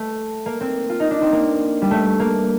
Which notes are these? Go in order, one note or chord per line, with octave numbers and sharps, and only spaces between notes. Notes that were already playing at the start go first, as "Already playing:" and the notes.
Already playing: A3
A#3
C4
F4
D#4
D4
C4
A#3
G3
A3
A#3